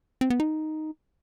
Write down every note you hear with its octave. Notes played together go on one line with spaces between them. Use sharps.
C4
B3
D#4